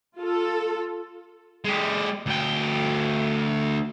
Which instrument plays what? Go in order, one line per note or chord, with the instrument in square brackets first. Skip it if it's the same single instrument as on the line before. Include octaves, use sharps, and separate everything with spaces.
[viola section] F4 A4
[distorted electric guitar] G#3 G4
D2 G5